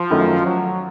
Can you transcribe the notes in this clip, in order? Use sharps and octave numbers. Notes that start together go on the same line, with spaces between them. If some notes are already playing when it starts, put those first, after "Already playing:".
Already playing: F3
F#2 D#3 F#3 A3
F#3